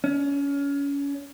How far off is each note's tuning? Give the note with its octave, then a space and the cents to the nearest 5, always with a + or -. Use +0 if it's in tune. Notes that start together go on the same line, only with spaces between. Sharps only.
C#4 +30